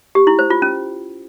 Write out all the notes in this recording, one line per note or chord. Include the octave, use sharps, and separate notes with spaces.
G4
E4
C5
F4
C#4